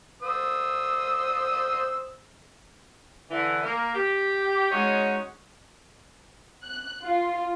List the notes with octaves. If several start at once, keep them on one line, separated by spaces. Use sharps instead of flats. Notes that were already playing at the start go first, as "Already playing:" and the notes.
C5 D#6 E6
D3 E3
A#3 A#4
G4
G#3 C#4 D#4 F#4 C#5
F#6
F4